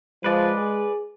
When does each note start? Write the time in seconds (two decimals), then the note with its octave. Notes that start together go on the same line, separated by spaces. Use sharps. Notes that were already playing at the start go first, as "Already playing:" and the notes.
0.24 F3 G#3 B4 D5
0.55 G#4